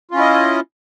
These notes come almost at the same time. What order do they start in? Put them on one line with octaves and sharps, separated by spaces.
F4 C#4 E4 D#5